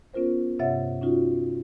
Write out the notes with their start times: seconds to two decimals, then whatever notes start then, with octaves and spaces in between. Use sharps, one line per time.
0.14 B3 C#4 F4 A#4 C5
0.59 G2 C3 C#5 E5 F#5 A6
1.02 C#4 D#4 F4 F#4